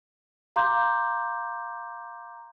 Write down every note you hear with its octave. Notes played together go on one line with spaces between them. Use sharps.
F5 A#5 C6 D6 G6